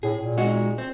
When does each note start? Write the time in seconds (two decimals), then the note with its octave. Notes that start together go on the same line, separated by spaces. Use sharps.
0.03 A2 G#4
0.19 A#2
0.37 G#3 D#4 F#4
0.78 C4